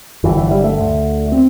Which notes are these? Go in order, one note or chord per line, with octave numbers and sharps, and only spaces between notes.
G1 G2 D3 E3
E3
G3
A3
D2 D3
C4